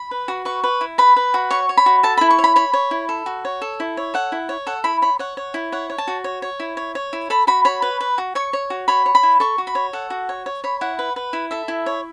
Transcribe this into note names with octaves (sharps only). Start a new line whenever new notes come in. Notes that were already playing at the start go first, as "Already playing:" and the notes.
Already playing: B5
B4
F#4
B4 C#6
B4
E4
B4 B5
B4
F#4
C#5 C#6
C#5
B5
F#4
A4 A5
E4 B5
C#6
C#5
B5
C#5 B5
C#5
E4
A4
F#4
C#5
A4
E4
C#5
A4 F#5
E4
C#5
A4 F#5
E4 B5
C#5 B5
C#5 F#5
C#5
E4
C#5 F#5
C#5
A5
F#4
C#5
C#5
E4
C#5
C#5
E4
A4 B5
F#4 B5
C#5 B5
B4
B4
F#4
C#5 C#6
C#5
F#4
C#5 B5
C#5
B5
E4
A4 C#6
F#4
B5
C#5
A4 F#5
F#4
C#5
C#5
C#5 B5
E4 F#5
B4
B4
E4
A4 E5
E4
C#5